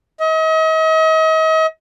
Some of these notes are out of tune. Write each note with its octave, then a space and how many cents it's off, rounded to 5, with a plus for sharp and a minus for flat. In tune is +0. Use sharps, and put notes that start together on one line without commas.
D#5 +40